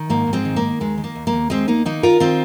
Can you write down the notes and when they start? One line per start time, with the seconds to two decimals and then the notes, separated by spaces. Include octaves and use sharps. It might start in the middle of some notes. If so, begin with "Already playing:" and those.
Already playing: D#3
0.10 G#2 A#3
0.27 G#2
0.33 G#3 C4
0.45 D#3
0.56 A#3
0.62 D#3
0.80 D#2 G#3
0.98 D#3
1.04 A#3
1.15 D#2
1.27 A#3
1.33 D#2
1.50 D#2 G#3 C4
1.68 D#2 A#3 D#4
1.85 D#3 A#3 D#4
2.03 D#3 F4 A#4
2.20 D#3 C4 F4